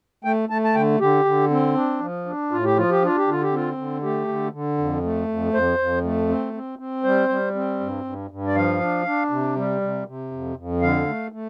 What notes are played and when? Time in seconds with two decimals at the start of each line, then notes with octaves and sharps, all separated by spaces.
0.24 A3 G5
0.49 A3 A5
0.64 A5
0.75 D3 G5
1.00 D3 G4
1.25 D3
1.50 C4
1.75 D4
2.00 F3
2.26 D4
2.51 A2 F4
2.64 G4
2.76 F3 F4
2.90 G4
3.02 D4 F4
3.17 G4
3.27 D3 F4
3.42 G4
3.52 C4 F4
3.77 D3
4.02 A3 G4
4.28 D3
4.53 D3
4.78 F2
5.03 A3
5.28 F2
5.53 F2 C5
5.78 F2
6.04 A3
6.29 C4
6.53 C4
6.79 C4
7.04 G3 C5
7.29 G3
7.55 C4
7.80 G2
8.04 G2
8.31 G2
8.47 D5
8.55 F3 F5
8.81 D4
9.06 D4
9.30 C3
9.56 G3
9.81 C3
10.07 C3
10.32 F2
10.56 F2
10.82 D3 F5
11.07 A3
11.32 A3